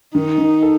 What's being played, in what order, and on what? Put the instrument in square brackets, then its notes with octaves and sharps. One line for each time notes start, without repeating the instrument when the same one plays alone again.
[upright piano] D#3 [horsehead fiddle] D#4
[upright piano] D#3
A4